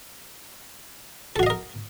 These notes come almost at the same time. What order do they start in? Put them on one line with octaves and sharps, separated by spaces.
A4 F#4 F5 D#5 A#4